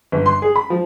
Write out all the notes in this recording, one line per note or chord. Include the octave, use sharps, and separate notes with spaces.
G1
C6
G#4
B5
F3